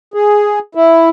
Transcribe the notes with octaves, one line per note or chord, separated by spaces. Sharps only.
G#4
E4